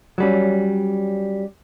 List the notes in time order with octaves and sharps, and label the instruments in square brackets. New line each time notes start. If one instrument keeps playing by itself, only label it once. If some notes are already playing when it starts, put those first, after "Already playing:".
[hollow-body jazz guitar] F#3 G3 C#4